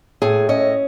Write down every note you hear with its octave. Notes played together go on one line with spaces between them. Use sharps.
A2 G#4
C#4 D#5